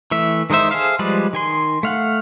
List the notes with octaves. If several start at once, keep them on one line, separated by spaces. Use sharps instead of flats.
E3 A3 E5
D#3 G#3 D#4 C5 E5
G#4 A4 C5 E5 F5
F3 G3 G#3 B4 D5
D#3 G#5 C6
A3 F5 F#5